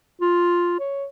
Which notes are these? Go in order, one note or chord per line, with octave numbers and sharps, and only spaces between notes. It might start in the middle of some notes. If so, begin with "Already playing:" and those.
F4
C#5